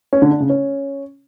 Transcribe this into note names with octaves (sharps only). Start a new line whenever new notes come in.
C#4
D3
D4
C#3
C#4